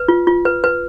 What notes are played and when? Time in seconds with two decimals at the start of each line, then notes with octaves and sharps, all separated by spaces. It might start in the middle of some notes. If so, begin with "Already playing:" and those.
Already playing: B4
0.08 F4
0.27 F4
0.45 B4
0.64 B4